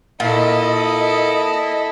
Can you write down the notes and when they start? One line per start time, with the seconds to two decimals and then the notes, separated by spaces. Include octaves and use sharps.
0.20 A#2 E4 A4 D#5